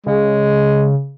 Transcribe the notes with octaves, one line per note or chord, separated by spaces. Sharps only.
C#3 G#3